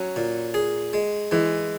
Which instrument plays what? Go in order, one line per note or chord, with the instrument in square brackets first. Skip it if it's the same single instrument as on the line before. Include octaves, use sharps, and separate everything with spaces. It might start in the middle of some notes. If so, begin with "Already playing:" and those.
Already playing: [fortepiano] F#3 [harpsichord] C#4
[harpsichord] A#2
G#4
G#3
[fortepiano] E3 [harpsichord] G#3